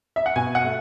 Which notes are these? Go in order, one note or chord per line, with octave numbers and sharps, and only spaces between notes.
E5
F#5
B2 G#5
F#5
A3